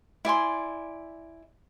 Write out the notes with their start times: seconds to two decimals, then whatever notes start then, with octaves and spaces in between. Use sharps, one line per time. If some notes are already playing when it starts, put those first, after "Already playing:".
0.25 E4 D5 G#5 C6